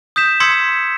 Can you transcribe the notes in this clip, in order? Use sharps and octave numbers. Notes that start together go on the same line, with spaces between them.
D#6 G6 B6 E7
C6 D#6 E6 G#6 B6 C#7